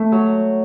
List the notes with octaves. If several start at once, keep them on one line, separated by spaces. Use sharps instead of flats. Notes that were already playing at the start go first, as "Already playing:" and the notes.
Already playing: A3
F#3